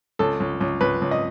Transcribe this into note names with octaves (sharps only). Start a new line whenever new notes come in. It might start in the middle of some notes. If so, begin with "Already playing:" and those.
C#2 A4
C#2
C#2
C#2 B4
C#2
D#5